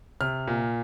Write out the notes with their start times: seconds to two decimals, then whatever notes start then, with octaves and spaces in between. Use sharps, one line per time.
0.21 C3 F6
0.47 A#2